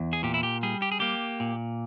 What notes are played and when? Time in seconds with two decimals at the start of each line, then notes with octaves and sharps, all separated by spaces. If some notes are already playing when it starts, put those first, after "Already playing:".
Already playing: E2
0.13 G#4
0.23 A#2 G4
0.34 E4
0.43 G4
0.63 G3 G#4
0.82 G4
0.92 G#4
1.00 A#3 G4
1.40 A#2